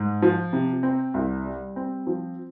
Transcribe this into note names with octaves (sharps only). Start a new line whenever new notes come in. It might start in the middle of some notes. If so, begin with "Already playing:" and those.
Already playing: G#2
F3
C3
C4
C2
G3
C4
F3